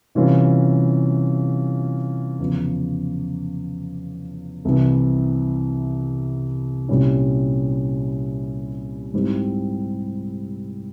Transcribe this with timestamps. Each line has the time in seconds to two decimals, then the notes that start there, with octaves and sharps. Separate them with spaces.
0.15 C3 E3 G3 C#4 F4
2.39 E2 C#3 F3
4.65 C2 C3 E3
6.89 C2 A#2 G3 C#4 E4
9.14 G#2 G3 C4 E4 G4